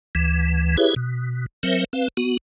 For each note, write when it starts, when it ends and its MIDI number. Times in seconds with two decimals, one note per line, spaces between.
0.15 0.77 38
0.15 0.77 52
0.77 0.94 64
0.77 0.94 67
0.77 0.94 68
0.77 0.94 71
0.77 0.94 73
0.77 0.94 76
0.96 1.46 47
1.63 1.84 54
1.63 1.84 60
1.63 1.84 70
1.63 1.84 72
1.63 1.84 76
1.93 2.08 60
1.93 2.08 71
1.93 2.08 77
2.17 2.37 59
2.17 2.37 66